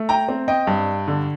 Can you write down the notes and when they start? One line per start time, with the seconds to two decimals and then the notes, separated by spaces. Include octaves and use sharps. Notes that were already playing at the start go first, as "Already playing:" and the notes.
Already playing: A3
0.09 G5 A#5
0.28 C4
0.48 D#5 G5
0.67 G2
1.08 D3